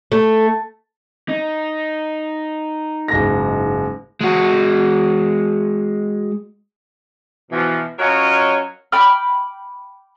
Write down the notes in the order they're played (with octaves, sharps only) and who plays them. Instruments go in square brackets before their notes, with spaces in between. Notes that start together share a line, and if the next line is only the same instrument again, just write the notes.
[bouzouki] A3
[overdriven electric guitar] D#4
[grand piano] F#1 G#2 A#6
[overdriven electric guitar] G#3 F#4
[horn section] B2 E3 F3
F#3 C#4 F4 A#4 C#5 D#5
[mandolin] G5 B5 D6 F6